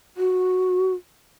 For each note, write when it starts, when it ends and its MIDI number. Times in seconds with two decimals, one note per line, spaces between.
0.17 0.93 66